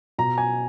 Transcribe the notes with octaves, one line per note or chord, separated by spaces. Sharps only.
B2 A#5
G#5